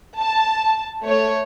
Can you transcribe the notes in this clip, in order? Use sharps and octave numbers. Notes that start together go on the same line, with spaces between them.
A5
A3 C#5